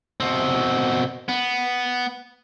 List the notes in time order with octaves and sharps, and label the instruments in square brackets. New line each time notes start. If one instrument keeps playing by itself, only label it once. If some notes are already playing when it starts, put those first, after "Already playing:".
[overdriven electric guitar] B2 C4
B3